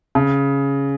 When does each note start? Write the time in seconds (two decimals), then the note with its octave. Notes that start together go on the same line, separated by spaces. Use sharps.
0.15 C#3